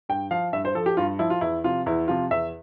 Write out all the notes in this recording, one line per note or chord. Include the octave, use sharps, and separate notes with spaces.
G2 G5
F3 F5
G2 E5
C5
F3 A4
G4
G2 F4
F3 E4
F4
E2 E4
C3 F3 F4
E2 E4
C3 F3 F4
E2 E5